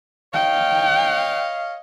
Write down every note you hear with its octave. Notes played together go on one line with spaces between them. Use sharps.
C#5 D#5 F5 G5